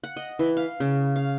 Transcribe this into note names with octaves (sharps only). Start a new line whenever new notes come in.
F#5
D#5
E3
F5
C#3
F5